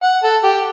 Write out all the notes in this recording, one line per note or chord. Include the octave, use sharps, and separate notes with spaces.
F#5
A4
G4